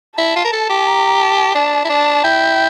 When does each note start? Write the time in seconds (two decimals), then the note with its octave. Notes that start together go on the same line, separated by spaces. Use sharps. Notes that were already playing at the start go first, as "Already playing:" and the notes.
0.18 E4 A5
0.36 F4
0.45 A#4
0.53 A4
0.69 G4
0.87 A#5
1.22 A5
1.55 D4 A5
1.85 E4
1.89 D4 A5
2.24 E4 G5